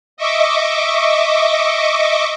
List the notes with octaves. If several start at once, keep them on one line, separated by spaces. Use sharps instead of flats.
D#5 E5 C#6 D6